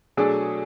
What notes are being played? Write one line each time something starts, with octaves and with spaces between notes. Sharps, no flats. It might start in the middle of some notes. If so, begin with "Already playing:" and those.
B2 F#3 A3 D4 G#4 A4